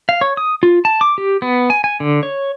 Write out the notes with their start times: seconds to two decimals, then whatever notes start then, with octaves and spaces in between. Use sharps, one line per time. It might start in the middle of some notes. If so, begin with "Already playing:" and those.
0.09 F5
0.21 C#5
0.37 D#6
0.63 F4
0.85 A5
1.01 D6
1.18 G4
1.42 B3
1.70 G#5
1.84 G#5
2.00 D3
2.23 C#5